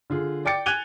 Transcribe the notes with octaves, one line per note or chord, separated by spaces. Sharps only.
D3 F4 G#4
D5 G5 D6 A6 C#7
G#5 F#6 G#6 D#7 F7 G7